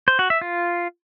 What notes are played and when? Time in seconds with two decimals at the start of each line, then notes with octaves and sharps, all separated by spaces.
0.08 C5
0.19 F#4
0.30 E5
0.41 F4